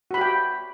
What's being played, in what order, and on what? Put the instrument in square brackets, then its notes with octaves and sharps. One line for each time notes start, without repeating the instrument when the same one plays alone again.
[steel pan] F#4
B5
G4
G5